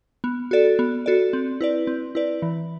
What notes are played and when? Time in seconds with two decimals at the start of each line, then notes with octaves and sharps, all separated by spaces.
0.24 B3
0.51 F#4 A4 D5
0.79 B3
1.06 F#4 A4 D5
1.33 C4
1.61 E4 B4 D5
1.87 C4
2.15 E4 B4 D5
2.42 E3